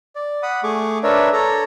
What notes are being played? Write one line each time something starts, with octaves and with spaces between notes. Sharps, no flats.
D5
F#5 B5 D#6
A3 G#4 C#6 D6
D4 A#4 B4 C#5 D5 E5
A4 C#5 A#5